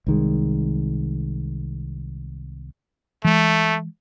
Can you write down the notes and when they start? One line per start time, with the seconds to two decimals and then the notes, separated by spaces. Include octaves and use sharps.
0.07 C2 D#3 G#3
3.25 E3 G#3 A3